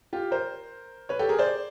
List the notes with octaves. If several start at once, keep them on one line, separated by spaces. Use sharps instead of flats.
F4 G4
A#4 C5
B4 C#5
G4 A4
G#4 A#4
C5 D5